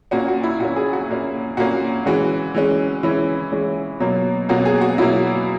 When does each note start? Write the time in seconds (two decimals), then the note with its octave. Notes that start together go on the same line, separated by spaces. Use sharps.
0.11 A#2 A#3 C#4 F#4
0.28 F#4
0.43 E4
0.60 A#2 A#3 C#4 F#4
0.76 G#4
0.93 F#4
1.09 A#2 A#3 C#4
1.57 A#2 A#3 C#4 F#4
2.06 E3 G#3 C#4 F#4
2.54 E3 G#3 C#4
3.03 E3 G#3 C#4 E4
3.52 E3 G#3 C#4
4.00 B2 F#3 A#3
4.49 B2 F#3 A#3 F#4
4.65 G#4
4.81 F#4
4.98 B2 F#3 A#3 E4